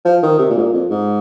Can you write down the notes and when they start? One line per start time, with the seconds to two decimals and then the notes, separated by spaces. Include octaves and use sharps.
0.05 F3
0.23 D#3
0.39 C3
0.50 A#2
0.57 G#2
0.62 A#2
0.73 F2
0.90 G#2